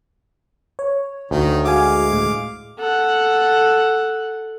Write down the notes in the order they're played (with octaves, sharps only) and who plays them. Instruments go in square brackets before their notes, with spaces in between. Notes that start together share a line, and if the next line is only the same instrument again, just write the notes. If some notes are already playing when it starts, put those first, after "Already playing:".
[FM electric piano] C#5
[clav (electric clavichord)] D2 [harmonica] D#3
[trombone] G#3 [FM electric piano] F#4 G#5 [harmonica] F5 D6
[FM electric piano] A2
[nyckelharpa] A4 F#5